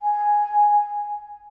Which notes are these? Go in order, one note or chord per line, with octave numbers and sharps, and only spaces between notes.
G#5